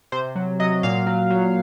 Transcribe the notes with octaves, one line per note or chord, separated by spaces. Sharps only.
C3 C5
F#3
F#3 D#5
A#2 F5
F#3
F#3